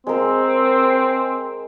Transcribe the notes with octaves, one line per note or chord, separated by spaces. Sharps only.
G#3 C4 A#4